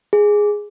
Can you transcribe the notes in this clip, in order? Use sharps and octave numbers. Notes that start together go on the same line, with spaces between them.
G#4